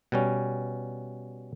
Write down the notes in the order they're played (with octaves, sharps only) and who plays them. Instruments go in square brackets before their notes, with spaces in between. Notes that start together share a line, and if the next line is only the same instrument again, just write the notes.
[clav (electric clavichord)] B2 G3 C#4